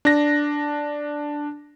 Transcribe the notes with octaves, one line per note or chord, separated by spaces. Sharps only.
D4 A#6